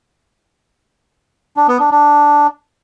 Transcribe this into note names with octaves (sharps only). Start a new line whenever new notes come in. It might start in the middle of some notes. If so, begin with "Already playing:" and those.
D4
B3
D4
D4